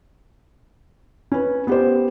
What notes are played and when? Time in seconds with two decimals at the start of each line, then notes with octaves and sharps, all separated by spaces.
1.32 C#4 B4
1.67 B3 G4 C5